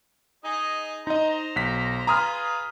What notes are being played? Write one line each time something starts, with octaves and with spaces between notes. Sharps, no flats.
D#4 G#4 D#5
D#4 C5 D#5 A#5
B1 B6
F4 G#4 B4 A#5 D#6 F6